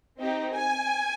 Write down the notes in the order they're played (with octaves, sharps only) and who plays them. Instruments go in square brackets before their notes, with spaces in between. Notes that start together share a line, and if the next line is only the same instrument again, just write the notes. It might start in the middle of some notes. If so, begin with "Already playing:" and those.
[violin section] C4 D#4 G4
G#5